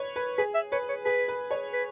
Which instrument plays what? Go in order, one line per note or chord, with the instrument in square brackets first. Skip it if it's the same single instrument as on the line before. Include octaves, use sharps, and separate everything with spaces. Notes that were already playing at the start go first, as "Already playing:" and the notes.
Already playing: [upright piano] B4 C#5
B4
[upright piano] G#4 [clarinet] B4
[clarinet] E5
[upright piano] B4 [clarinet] C#5
[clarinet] C#5
[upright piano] G#4 [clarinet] B4
[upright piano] B4
C#5
[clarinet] B4